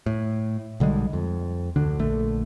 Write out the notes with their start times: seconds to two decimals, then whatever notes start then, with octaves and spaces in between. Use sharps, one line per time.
0.06 A2
0.80 B1 D3 G3 G#3
1.13 F2
1.76 D2 D3 D4
1.99 A#1 D3 A3